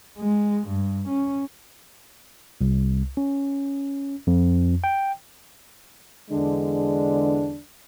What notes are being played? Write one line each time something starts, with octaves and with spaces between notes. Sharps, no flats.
G#3
G2
C#4
C2
C#4
F2
G5
E2 D3 G#3 D4